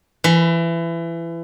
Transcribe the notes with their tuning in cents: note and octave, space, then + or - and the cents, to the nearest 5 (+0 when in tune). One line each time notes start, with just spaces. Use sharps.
E3 +25 B5 +0